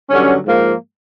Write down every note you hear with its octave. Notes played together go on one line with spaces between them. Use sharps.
G2 D3 F#3 C#4
G#2 F3 A#3